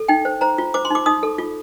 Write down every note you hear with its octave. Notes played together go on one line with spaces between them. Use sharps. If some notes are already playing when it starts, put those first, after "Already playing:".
Already playing: A4
D#4 G5
C5
C5 A#5
F4
C5 D6
C6
D#4 D6
D#4 D#6
A4
F4